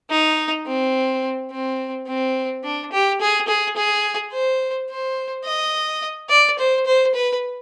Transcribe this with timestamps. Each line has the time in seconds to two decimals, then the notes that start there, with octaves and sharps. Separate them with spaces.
0.10 D#4
0.66 C4
1.51 C4
2.07 C4
2.64 D4
2.92 G4
3.21 G#4
3.48 G#4
3.76 G#4
4.33 C5
4.90 C5
5.45 D#5
6.30 D5
6.59 C5
6.86 C5
7.15 B4